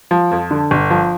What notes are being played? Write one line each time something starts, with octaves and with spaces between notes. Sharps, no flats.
F3
F2
D3
G1
F3